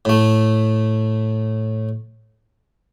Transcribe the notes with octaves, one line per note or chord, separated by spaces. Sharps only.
A2 A3